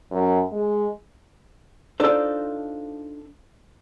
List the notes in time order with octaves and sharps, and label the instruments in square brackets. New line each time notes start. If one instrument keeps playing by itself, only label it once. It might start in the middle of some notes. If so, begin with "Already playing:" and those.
[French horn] F#2
G#3
[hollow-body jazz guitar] D4 D#4 F4 A4 C5